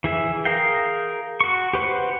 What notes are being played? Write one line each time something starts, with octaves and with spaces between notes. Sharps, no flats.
E3 G#4 E5
G#4 A#4 F5 G5
F#4 C#6
G4 B4 C5 F#5